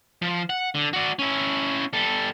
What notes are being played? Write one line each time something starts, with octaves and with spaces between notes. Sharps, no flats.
F3
F#5
D3
F#4 D5
C#4 E4
G3 A4